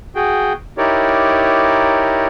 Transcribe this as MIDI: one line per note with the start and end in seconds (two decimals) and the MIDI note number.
0.15 0.53 66
0.15 0.53 68
0.15 0.53 79
0.78 2.27 63
0.78 2.27 64
0.78 2.27 67
0.78 2.27 70
0.78 2.27 73
0.78 2.27 74